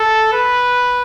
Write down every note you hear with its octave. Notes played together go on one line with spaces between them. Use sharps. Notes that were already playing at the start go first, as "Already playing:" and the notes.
Already playing: A4
B4